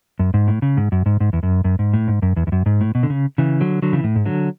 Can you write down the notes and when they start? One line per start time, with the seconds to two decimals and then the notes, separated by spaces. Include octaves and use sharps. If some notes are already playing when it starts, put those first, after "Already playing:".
0.19 F#2
0.34 G#2
0.48 A2
0.62 C#3
0.77 G#2
0.92 F#2
1.06 G#2
1.20 G#2
1.33 E2
1.43 F#2
1.64 F#2
1.79 G#2
1.94 A2
2.08 G#2
2.22 F#2
2.36 E2
2.47 E2
2.52 F#2
2.66 G#2
2.81 A2
2.95 B2
3.03 D3
3.10 C#3
3.38 C#3 E3
3.61 D3 F#3
3.82 D3 F#3
3.93 C#3 E3
4.04 A2
4.16 G#2
4.25 D3 F#3